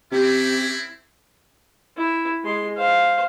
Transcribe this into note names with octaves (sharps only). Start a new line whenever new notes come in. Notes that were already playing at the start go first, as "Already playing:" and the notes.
C3 C4 C#4 E4 G4
E4
G#3 C6
C5 F5